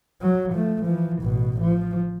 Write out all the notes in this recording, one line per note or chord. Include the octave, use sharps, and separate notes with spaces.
F#3
F3 A3
E3 F3
A1 B2
F3